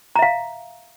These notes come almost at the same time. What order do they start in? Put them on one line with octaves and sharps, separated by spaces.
A#5 E5 F5